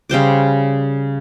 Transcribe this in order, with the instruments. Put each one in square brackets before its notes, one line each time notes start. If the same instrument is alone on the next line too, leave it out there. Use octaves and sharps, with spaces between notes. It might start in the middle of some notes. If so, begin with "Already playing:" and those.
[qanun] C#3 G3 C5 D6